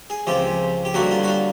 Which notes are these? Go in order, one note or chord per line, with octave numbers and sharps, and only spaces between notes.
G#4
C#2 C3 F3 G4
G4
G2 D3 F#3 A#3 F#4
F4
F#4
F4